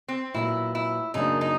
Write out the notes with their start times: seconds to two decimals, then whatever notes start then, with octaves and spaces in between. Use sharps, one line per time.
0.08 C4
0.34 A#2 F#3 B3 E4
0.75 E4
1.14 F#2 C#3 F#3 A#3 D4 D#4
1.41 D#4